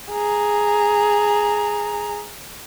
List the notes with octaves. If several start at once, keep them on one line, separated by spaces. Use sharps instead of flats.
G#4 A#5